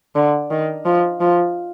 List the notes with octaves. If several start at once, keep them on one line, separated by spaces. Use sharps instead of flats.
D3
D#3
F3
F3